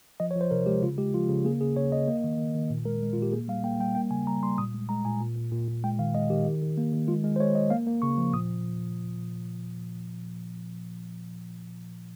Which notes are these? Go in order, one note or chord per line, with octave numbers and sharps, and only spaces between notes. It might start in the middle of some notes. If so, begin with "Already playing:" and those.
F3 D#5
C#5
F3
C5
C3 A#4
G#3 G4
C#3 F4
G#3 G4
F3 F4
C#3
A#3 G#4
C#3 G#4
C#3 C#5
C#3 D#5
A#3
D#3
D#3
D#3
A#2
G#3 A#4
G#3
A#2 F4
G4
A#3 G#4
G3 F5
A#3 G5
G3 G5
A#3 G5
C#3 G#5
G3 A#5
G3 C6
A#2 D#6
G#3
G#3 A#5
A#2 G#5
A#2
A#2
A#2
A#2
G#3 G5
D#3 F5
G#3 D#5
D#3 G4
D#3
D#3
A#3
D#3
G#3 F4
G#3
C5
G#3 C#5
G#3 D#5
A#3 F5
A#3
C#3 C#6
F3
A#2 D#6